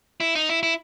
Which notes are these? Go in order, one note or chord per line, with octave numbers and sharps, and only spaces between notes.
E4
D#4
E4
E4